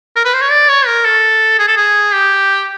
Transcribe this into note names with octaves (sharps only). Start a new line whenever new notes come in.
A#4
B4
C5
C#5
D5
C#5
A#4
A4
G#4
A4
G#4
G4